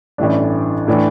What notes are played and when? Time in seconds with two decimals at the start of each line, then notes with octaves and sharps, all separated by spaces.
0.18 A1 G2 E3 A3 D4
0.88 A2 E3 A3 D4